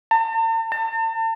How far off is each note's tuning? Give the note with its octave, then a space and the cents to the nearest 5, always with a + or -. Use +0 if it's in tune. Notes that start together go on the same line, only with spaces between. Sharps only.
A5 +45
A5 +40